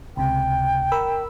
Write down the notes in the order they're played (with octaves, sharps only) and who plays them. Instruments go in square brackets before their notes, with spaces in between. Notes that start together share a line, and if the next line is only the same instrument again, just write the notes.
[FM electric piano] C#2 C3 [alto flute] G5
[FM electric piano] A#4 B5 E6